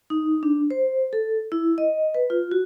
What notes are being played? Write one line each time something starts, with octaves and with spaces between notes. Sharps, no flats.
D#4
D4
C5
A4
E4
D#5
B4
F4
F#4